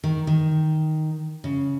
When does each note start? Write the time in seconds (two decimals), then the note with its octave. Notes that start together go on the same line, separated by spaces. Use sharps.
0.04 D#3
0.27 D#3
1.44 C#3